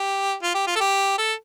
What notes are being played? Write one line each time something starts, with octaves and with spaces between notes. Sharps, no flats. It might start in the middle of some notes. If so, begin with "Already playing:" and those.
Already playing: G4
F4
G4
F4
A4
G4
A4